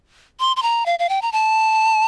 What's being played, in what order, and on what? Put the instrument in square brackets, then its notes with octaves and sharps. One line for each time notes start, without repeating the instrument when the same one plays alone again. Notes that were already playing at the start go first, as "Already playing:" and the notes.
[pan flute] C6
C6
A#5
F5
F5
G5
A#5
A5